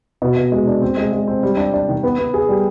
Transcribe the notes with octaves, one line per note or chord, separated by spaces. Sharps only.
B2
B2
G#3
D4
C4
G#3
G#3
C4
G3
D4
D4
D#3
B3
B3
G#4
G3